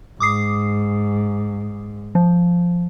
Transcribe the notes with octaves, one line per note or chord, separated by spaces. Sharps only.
G#2 D6 D#6 C7
F3